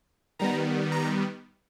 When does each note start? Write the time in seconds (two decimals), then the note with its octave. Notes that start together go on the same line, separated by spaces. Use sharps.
0.39 D#3 G3 B3 A#5
0.92 A#5